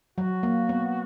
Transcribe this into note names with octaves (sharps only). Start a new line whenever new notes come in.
F#3 F#4
A#3
B3